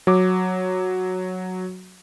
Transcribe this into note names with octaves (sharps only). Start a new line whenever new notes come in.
F#3 D6